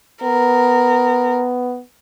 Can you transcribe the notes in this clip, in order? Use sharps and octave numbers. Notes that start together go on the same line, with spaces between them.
B3 A#4